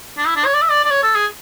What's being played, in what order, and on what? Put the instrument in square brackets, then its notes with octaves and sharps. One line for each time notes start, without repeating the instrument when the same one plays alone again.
[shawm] D4
E4
D4
C#5
D5
E5
D5
D5
C#5
A4
G#4